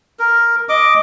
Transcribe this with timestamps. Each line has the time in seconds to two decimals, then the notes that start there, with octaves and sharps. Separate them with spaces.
0.19 A#4
0.69 D#5 D6